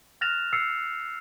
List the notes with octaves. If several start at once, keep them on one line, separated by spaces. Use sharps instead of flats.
F6 F#6 A6 A#6 E7 F7
E6 A6 C7 C#7